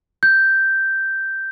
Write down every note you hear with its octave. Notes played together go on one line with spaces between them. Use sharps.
G6